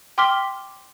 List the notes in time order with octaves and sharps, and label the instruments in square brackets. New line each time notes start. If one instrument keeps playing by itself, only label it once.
[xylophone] G5 C6 D6 F6 B6 G7